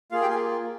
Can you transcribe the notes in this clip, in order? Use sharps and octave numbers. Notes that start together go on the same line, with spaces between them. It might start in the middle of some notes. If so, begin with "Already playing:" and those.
A#3 F4 G#4 F5
G4 G5
G#4 G#5